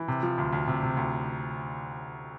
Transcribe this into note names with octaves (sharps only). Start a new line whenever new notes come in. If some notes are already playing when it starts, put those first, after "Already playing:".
Already playing: E3
C3
F3
D2
D2
C3
C3
D2